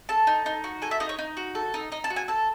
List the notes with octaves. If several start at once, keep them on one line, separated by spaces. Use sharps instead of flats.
A4 A5
D#4
D#4
F#4
A4 G#5
E5
D#4 D#5
C#5
D#4
F#4
A4
D#4
D#4 D#5
A5
F#4
G#5
A4 A5